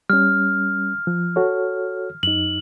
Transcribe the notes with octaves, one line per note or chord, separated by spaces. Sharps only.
G3 C#4 F6
F3
F#4 A4 C#5
F#2 D#4 F#7